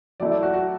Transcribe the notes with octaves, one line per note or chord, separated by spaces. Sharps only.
F#3 A3 E4 D5
D5
F#4
F#4